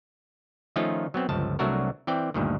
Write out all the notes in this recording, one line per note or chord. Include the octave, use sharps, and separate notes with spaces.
D#3 F3 A3 C#4 D#4 F4
F#3 B3 C4
G1 C#2 F3 A5
C2 F#3 A3 D4 F#4 A#4
E3 C4 D5 G5
D2 G2 A#2 D#3